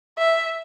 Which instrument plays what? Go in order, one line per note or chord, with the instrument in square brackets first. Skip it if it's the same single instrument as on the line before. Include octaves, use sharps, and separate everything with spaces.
[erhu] E5